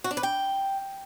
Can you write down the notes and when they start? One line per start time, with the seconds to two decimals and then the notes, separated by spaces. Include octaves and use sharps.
0.04 F#4
0.11 D4
0.17 B4
0.23 G5